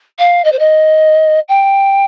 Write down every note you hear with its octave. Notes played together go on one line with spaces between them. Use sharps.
F5
D#5
C5
D#5
G5